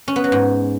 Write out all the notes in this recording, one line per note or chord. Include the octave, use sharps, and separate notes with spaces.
C#4
B3
F#3
G#2